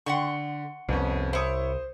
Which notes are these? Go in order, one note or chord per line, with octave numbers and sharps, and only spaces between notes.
D3 F#5 C6 C#6
C2 F2 B3 C#4
E4 C5 C#5 D#6